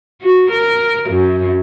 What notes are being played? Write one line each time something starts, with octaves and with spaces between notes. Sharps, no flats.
F#4
A#4
F#2